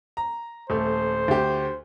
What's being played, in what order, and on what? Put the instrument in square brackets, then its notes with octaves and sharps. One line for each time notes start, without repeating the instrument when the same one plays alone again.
[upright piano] A#5
[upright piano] D#1 A3 [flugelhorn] C5
[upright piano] D2 G4